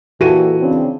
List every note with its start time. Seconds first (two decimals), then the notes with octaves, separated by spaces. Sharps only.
0.21 A#2 E3 F#4 G4 A4 D#7
0.60 C#3 C4 D4